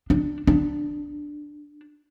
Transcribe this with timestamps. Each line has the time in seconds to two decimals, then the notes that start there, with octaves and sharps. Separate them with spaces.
0.10 D4
0.47 D4